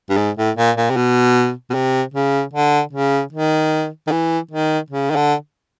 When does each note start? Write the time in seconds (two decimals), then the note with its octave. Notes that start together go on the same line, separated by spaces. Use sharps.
0.10 G2
0.17 G#2
0.37 A2
0.57 A#2
0.77 A#2
0.90 C3
0.96 B2
1.70 B2
1.74 C3
2.14 C#3
2.53 D3
2.93 C#3
3.33 D#3
4.07 D#3
4.11 E3
4.51 D#3
4.90 C#3
5.11 D#3
5.16 D3